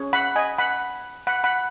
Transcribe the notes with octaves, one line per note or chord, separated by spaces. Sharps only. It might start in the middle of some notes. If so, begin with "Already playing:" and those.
Already playing: C#4 G#4 C#5
F#5 B5
D#5 G#5
F#5 B5
F#5 B5
F#5 B5